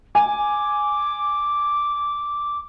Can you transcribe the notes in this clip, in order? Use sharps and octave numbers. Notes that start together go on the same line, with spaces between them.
G#5 D6